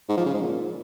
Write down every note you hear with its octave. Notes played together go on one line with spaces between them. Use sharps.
G#2
F3
C#3
G#2
A#2